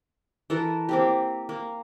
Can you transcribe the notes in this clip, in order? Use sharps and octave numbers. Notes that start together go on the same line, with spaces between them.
E3 A4 A#4
A#3 C4 G4
A#3